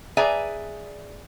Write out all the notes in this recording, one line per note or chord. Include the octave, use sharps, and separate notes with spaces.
G#4 B4 D5 E5 G#5 A#5